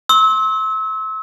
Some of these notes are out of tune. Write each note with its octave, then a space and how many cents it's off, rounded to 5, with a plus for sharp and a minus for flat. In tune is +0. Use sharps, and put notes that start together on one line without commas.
C6 +35 E6 -30